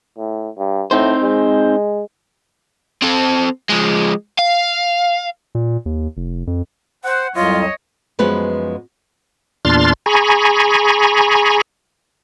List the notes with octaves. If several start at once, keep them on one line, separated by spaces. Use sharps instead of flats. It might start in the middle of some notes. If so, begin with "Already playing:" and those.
A2
G2
A2 C4 D#4 C5
G#3
C4 A4
F3 G#3
F5
A#2
D#2
F1
F2
C5 F#5
C2 F2 F#3 F4 C#5 D#5
F#2 F3 G#3 B3 F#4 B4
E2 A#2 D4 C6 F6 A6
G#4 G#5 A#5 B5 C#6